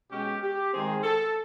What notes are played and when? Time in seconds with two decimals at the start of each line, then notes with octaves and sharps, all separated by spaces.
0.11 B2 G#3 C#4 G4
0.42 G4
0.73 D#3 G#3 C4 G#4
1.03 A4